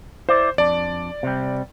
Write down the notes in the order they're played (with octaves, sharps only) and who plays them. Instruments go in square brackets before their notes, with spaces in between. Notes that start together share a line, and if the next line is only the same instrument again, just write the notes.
[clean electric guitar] E4 D5 [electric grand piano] C5
[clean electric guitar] F2 D4 [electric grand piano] D5
[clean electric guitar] C3 G3